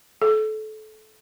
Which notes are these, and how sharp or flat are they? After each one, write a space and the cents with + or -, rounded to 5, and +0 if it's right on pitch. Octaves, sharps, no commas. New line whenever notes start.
A4 -25